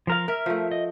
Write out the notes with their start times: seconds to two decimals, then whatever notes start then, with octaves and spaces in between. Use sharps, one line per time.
0.07 F3 A#4 F5
0.28 A#4 E5 F6
0.46 F3 A3
0.71 D#5